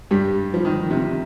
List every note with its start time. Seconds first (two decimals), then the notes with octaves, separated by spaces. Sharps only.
0.11 G2 G3
0.54 F3
0.65 D#3
0.91 C3